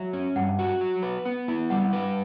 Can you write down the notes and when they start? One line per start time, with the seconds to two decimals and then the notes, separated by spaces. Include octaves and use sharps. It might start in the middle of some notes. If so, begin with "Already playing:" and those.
Already playing: F#3 E5
0.13 C#4
0.36 G2 F#5
0.59 F#4
0.81 F#3
1.03 B4
1.25 B3
1.48 E4
1.70 G3 F#5
1.93 B4